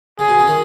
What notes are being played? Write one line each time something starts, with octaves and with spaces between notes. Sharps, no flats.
C#3 G#4
B2
C#3
D#3